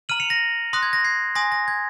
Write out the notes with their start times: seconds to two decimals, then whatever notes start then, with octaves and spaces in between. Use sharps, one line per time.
0.09 A#5 F6 D#7 F#7
0.20 C#7 F7
0.30 A#6
0.73 C6 D#6 F#6 A#6
0.83 G#6
0.93 A#6
1.04 G#6 C7
1.35 G#5 C6 D#6 A#6
1.52 A#6
1.68 G#6